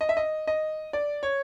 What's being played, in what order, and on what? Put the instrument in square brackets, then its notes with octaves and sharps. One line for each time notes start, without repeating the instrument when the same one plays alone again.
[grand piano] D#5
E5
D#5
D#5
D5
C#5